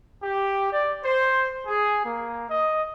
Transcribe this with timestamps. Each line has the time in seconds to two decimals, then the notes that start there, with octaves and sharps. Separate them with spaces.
0.22 G4
0.71 D5
1.03 C5
1.67 G#4
2.04 A#3
2.48 D#5